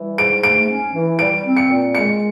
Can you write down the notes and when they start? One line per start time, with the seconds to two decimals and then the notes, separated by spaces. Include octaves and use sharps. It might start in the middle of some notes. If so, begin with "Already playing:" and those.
Already playing: E3 G3
0.18 G#2 D7
0.43 A3 D7
0.69 C#4
0.94 E3
1.19 G3 D7
1.44 C4
1.57 C#7
1.69 A#2
1.95 G#3 C#7